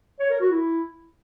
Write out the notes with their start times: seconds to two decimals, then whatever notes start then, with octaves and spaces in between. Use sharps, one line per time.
0.20 C#5
0.30 A#4
0.40 F#4
0.50 E4